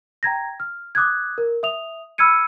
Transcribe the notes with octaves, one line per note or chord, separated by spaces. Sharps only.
G5 A#5 G#6 A#6
F6
D6 D#6 F#6 G#6
A#4
E5 D#6 F7
B5 E6 F6 G#6 C#7 D#7